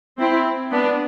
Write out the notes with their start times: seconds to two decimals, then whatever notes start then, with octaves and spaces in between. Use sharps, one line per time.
0.19 C4 E4
0.71 B3 D4